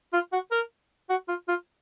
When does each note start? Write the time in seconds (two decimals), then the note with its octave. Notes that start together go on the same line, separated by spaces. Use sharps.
0.13 F4
0.33 F#4
0.51 A#4
1.09 F#4
1.28 F4
1.48 F4